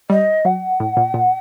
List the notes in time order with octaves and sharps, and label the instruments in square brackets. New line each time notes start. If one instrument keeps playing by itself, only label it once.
[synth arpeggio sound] G3 [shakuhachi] D#5
[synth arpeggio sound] F#3 [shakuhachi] F#5
[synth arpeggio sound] A2
A#2
A#2